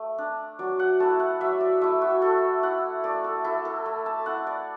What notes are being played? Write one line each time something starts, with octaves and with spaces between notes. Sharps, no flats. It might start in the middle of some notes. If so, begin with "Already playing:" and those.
Already playing: A3
D4
F#3 D5
F#5
A3 E4 A5
F#5
F#3 E5
D5
A3 E4 E5
F#4
A3 A4
E4 F#5
A3 D5
A4
E4 A4
A4
A3
A5
E4 F#5
D5